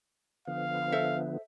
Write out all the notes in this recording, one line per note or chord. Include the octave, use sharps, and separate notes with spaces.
D3 F3 B3 F5
A4 C5 E5